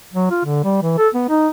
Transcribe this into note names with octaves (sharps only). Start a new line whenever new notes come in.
F#3
F4
D3
G3
E3
A4
B3
D#4